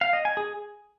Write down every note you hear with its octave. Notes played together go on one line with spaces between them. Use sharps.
F5
D#5
G#5
G#4